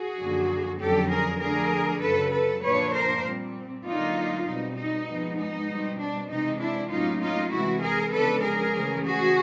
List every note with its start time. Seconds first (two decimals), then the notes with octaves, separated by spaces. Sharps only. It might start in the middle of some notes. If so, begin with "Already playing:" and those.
Already playing: F#4 G#4
0.18 F#2 D3 F3 A#3
0.79 F2 D3 F#3 A#3 C#4 G4 A4
1.10 G#4 A#4
1.40 D3 F3 A3 D4 G#4 A#4
2.01 F#2 C#3 F#3 A4 B4
2.31 A4 B4
2.62 A#2 F3 A#3 D4 B4 C#5
2.93 A#4 C5
3.23 A#2 G3 C4
3.84 D3 F#3 A#3 D#4 F4
4.45 B2 G3 C4 D#4
4.76 D#4
5.06 G#2 F3 G#3 B3
5.37 D#4
5.67 B2 G3 C4
5.98 D4
6.29 C3 E3 G#3 C4 D#4
6.59 D4 E4
6.89 A2 F#3 A#3 C#4 D#4 F4
7.20 D#4 F4
7.50 C3 E3 G#3 E4 F#4
7.81 G#4 A#4
8.11 C#3 F3 G#3 B3 D4 A4 B4
8.42 G#4 A#4
8.73 C#3 E3 A3 C#4
9.03 F#4 G#4